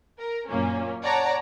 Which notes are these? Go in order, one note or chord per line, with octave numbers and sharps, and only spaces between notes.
A#4
F#2 A#2 A#3 C#4
C#5 D5 F#5 A5 A#5